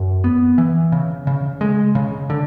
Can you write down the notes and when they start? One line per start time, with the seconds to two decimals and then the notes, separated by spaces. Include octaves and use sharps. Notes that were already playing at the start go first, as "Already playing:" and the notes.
Already playing: F#2
0.24 B3
0.58 E3
0.92 C#3
1.27 C#3
1.61 G#3
1.95 C#3
2.30 D3